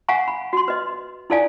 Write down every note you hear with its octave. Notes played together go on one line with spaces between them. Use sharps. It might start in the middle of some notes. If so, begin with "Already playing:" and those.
F5 F#5 G#5 A#5 C#6
B5
F#4 C6
B4 D#5
D#4 E4 A4 D5 F5 G#5